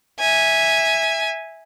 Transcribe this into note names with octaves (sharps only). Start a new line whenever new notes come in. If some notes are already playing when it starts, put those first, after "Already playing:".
E5 G#5